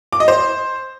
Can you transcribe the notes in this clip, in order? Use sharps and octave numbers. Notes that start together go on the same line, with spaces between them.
D6
D#5
C5